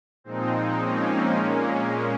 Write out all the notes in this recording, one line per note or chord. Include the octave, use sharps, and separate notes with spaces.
A#2 F3 G#3 C4 D#4
A#3 C#4
A#2 G#3